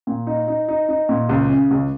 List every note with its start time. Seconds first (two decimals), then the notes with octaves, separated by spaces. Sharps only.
0.07 A#2
0.27 D#4
0.48 D#4
0.69 D#4
0.89 D#4
1.09 A#2
1.29 C#2
1.49 C#3
1.71 C#2